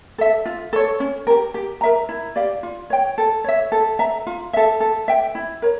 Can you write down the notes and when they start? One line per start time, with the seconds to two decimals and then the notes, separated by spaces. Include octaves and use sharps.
0.18 A4 E5
0.46 F4
0.73 A4 C#5
1.00 C#4
1.27 G4 A#4
1.54 G4
1.81 A#4 E5 A#5
2.09 E4
2.36 G4 D5 F5
2.63 F4
2.90 C#5 G5
3.18 A4
3.44 C#5 E5
3.72 A4
3.99 E5 A#5
4.27 F4
4.53 A4 E5
4.80 A4
5.08 E5 G5
5.35 E4
5.62 A#4 C#5